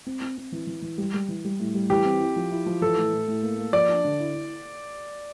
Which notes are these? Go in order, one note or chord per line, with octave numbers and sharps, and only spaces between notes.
C4
C4
C4
E3
E3
E3
G3
G3
E3
G3
A2
G3
E3 G4
C4
E4
F3
E4
F3
E3 A4
A2
A2
A2
A#3
A#3
F3 D5
D4
D3
E4
E4